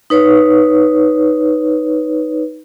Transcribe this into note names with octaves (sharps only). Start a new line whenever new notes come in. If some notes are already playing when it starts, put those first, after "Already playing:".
D#4 B4 C#5